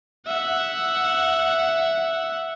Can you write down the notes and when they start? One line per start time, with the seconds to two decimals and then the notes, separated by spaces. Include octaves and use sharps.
0.27 E5 F#5